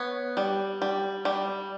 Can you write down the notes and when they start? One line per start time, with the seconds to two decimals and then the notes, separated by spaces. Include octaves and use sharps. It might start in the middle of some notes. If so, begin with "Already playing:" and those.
Already playing: B3 C#5
0.37 G3
0.82 G3
1.25 G3